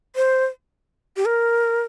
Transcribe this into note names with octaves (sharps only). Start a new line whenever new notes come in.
C5
G4
A#4